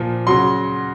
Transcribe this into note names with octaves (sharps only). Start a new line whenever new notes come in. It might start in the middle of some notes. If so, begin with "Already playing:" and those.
Already playing: A#2 F3
C#3 F#3 C6